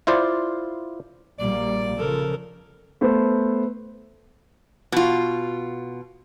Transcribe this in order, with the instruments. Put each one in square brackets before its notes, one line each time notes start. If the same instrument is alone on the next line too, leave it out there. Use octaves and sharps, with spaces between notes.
[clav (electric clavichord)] E4 F4 C5 D5
[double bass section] A#1 G3 A#3 [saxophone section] D5
[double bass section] C#3 F3 [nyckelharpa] A4 A#4
[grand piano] A3 B3 C5
[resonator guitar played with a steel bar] B2 F4